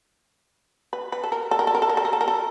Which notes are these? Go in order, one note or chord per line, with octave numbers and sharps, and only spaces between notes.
B4
B4
A4
A#4
A4
A#4
A4
A#4
A4
A#4
A4
A#4
A4
A#4
A4